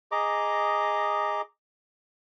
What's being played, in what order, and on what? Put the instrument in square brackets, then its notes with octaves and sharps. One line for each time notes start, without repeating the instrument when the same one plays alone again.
[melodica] G#4 D#5 A#5 D6